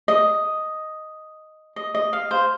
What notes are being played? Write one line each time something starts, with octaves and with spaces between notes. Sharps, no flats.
D#5
D#5
D#5
F5
C5